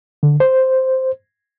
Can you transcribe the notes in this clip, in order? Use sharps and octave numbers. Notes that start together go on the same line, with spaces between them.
D3
C5